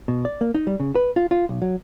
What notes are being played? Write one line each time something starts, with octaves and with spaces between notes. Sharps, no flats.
B2
D5
A#3
D#4
G3
C#3
B4
F4
F4
B1
F#3